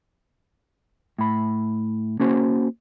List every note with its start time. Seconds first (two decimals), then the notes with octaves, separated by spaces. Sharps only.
1.19 A2 B5
2.20 A#3 C#4 F#4 C5